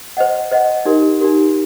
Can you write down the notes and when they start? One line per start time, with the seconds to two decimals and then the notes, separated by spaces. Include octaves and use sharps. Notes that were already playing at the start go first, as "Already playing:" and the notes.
0.17 C5 D#5 F#5
0.51 C5 D#5 F#5
0.85 D#4 G4 A#4
1.21 D#4 G4 A#4